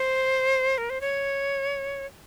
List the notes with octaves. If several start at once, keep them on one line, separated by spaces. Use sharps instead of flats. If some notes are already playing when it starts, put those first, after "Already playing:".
Already playing: C5
A#4
C5
C#5